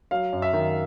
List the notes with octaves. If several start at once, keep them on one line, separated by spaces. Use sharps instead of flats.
F#3 F5
F#2
E5
D#3